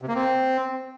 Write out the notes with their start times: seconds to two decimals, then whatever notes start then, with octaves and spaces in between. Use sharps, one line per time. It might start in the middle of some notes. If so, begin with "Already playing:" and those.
0.02 C3
0.08 A#3
0.15 C4